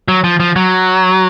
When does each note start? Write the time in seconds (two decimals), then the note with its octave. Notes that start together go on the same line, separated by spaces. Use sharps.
0.08 F#3
0.24 F3
0.40 F3
0.56 F#3